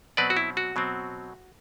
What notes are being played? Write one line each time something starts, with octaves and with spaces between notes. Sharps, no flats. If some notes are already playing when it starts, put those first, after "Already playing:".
B2 F#3 C4 B4 D5
F#4
E4
F#4
B2 F#3 C4